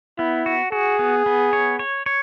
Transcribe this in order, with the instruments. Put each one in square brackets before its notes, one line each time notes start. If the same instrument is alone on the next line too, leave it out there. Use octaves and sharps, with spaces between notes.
[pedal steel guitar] B3 [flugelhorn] E4
[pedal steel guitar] F#4
[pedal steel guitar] F#4 [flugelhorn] G#4
[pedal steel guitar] B3
B3
C#5
C#5
C#5